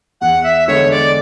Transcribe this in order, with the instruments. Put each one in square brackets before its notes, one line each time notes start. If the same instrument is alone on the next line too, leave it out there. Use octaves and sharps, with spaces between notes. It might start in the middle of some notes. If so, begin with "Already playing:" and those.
[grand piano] E2 [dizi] F#5
[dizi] E5
[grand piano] D3 G#3 B3 [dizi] C#5
[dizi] D5